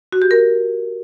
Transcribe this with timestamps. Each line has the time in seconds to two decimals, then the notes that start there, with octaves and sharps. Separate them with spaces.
0.12 F#4
0.22 G4
0.31 A#4